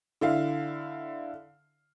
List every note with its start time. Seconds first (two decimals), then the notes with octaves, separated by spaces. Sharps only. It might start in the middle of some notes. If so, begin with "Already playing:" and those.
0.21 D3 E4 F5